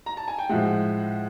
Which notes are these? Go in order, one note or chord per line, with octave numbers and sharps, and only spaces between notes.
A#5
A5
G#5
G5
A2 F3 G#3 E5 F#5